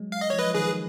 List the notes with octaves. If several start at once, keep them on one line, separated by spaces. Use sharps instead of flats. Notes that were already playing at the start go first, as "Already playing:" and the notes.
Already playing: F#3 G#3
F5
D#5
F3 C#5
B4 D#5
F3
D#3 G#4 B4